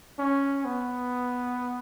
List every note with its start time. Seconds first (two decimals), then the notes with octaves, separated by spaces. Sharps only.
0.19 C#4
0.65 B3